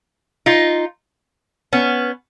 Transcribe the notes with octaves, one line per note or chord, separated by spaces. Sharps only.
D#4 F4
B3 C#4